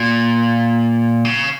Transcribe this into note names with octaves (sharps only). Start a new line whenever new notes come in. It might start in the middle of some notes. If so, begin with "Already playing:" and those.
Already playing: A#2
C#3